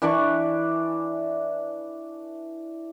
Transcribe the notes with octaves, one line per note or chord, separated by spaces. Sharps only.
E3 D4 D5 C#6